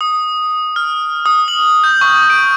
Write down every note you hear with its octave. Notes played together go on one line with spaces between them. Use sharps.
D#6
F6
D#6
F#7
G6
C#6
D7